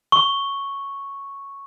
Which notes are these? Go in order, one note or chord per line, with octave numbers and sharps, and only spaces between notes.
C#6